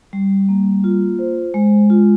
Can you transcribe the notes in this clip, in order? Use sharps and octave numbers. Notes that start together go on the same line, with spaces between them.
G3
A#3
F4
C5
G#3
F4